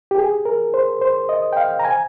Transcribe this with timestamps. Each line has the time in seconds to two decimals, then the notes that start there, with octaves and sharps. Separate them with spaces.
0.11 G4
0.18 G#4
0.45 A#4
0.74 C5
1.01 C5
1.29 D#5
1.53 G5
1.57 F5
1.79 A#5
1.85 G#5